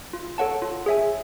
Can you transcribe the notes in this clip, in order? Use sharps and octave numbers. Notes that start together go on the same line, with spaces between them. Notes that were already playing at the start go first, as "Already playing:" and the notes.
F4
A4 C#5 F#5 A5
F4
G#4 C#5 E5 G#5